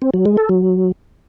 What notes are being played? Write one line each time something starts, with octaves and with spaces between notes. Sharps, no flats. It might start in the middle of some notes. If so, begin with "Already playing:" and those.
C4
F#3
G#3
A4
F#3